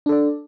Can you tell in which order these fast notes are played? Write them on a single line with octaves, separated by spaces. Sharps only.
D4 A4 D5